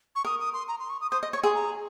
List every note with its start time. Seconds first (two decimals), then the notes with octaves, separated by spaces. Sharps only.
0.15 C#6
0.25 A#4 D#6
0.39 D#6
0.53 C6
0.68 A#5
0.80 C6
0.90 C#6
1.01 D#6
1.11 C5 D#6
1.23 D#5
1.33 C#5 C#6
1.43 G#4 C6
1.55 A#5